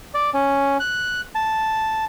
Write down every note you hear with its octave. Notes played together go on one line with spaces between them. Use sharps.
D5
C#4
F#6
A5